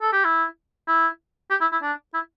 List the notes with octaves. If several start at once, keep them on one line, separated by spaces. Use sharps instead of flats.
A4
G4
E4
E4
G4
E4
E4
D4
E4